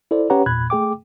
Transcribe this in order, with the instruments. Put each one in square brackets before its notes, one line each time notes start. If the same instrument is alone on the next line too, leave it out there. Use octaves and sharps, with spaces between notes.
[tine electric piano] E4 A4 C5 D5
C#4 G4 B4 C#5 F#5 A#5
E2 A#2 B5 F#6 G#6
A3 G#4 G5 D6